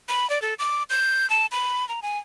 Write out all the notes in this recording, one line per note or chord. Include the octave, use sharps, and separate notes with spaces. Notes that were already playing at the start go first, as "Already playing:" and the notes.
B5
D5
A4
D6
G6
A5
B5
A#5
G#5